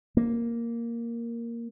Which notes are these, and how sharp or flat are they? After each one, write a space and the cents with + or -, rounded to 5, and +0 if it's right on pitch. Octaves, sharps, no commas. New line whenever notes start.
A#3 +0